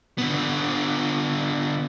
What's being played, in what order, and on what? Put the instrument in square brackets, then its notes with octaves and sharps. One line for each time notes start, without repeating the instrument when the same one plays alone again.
[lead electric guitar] D3 B3